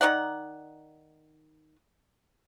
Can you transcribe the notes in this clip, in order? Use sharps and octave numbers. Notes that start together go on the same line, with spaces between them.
D#3 D#4 D5 F#5